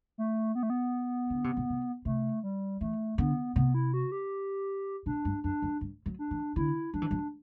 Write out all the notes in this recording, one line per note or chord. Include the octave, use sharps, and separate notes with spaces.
A3
B3
A3
B3
D3
C3
B2
C3
C3 A3
G3
E3 A3
D3 B3
C3 B3
E4
F#4
G4
B2 D4
G2
F#2 D4
F#2
G2
F#3
D4
E3
D3 E4
F#3 D4
E3
F#3